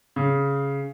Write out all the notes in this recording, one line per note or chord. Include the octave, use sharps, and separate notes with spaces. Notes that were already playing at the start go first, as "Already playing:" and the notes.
C#3